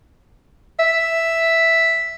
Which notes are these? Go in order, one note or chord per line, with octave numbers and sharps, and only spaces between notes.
E5